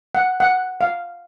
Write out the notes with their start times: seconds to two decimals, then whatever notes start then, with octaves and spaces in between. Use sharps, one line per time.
0.15 F#5
0.40 F#5
0.81 F5